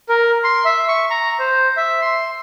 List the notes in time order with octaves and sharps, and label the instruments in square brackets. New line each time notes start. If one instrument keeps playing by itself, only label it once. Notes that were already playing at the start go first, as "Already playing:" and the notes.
[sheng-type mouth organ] A#4
C6
E5
C#6
A#5
C5
E5
C6